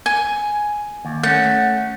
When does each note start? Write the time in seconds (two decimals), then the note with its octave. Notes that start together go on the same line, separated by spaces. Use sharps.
0.06 G#5
1.05 D#2
1.23 A3 C#4 F#5